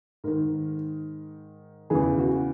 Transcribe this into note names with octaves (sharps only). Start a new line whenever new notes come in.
G#2 D#3 A#4
E2 C#3 E3 G#4
F#4